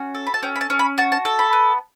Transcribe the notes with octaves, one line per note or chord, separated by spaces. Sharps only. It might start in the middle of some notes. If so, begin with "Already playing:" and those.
Already playing: C#4 F#4
A4
B5
A5
C#4 G5
B5
A5
C#4
B5
F#4 A5
A5
A4
B5
B3